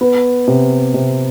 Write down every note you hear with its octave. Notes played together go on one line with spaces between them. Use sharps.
B3
C3
C3